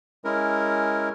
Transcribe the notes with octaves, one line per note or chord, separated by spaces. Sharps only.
G#3 C#4 E4 A#4